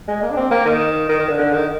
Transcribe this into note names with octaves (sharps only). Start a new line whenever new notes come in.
G#3
A#3
D4
C4
A#3
D#3
D#3
D#3
D3
D3
D#3